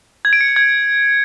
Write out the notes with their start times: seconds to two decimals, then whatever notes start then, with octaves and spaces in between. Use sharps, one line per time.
0.25 G#6
0.33 D7
0.41 C#7
0.48 D7
0.56 G#6